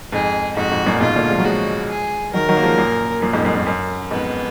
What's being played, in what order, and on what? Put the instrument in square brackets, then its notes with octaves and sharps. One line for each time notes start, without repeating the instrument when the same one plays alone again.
[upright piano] F2 G#2 [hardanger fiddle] G#4
[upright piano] F2 G#2 [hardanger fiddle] F#4
[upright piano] F2 G#2
F#2 A#2
[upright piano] G#2 B2 [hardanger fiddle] F4
[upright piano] A#2 D3
F3 G#3
F#3
[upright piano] F3 G#3 [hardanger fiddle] F#4
[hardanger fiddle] G#4
[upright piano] D#3 F#3 [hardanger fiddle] A#4
[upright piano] D#3 F#3
A#3
F3 G#3
F#2 A#2
F#2 A#2
F2 G#2
F#2
F#2
F#2
[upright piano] F2 G#2 [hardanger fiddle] B3